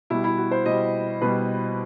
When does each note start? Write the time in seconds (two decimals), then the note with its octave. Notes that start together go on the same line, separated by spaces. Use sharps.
0.10 B2 G3 E4
0.24 E4
0.38 F#4
0.51 C5
0.66 B2 G3 D#5
1.21 B2 G3 B4